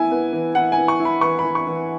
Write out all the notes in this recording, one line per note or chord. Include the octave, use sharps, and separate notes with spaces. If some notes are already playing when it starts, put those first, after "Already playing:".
Already playing: E3 B3 E4 G#5
B3
E3
E4 F#5
G#5
E3
C#6
E4
B5
E3 C#6
B5
E3
C#6
E3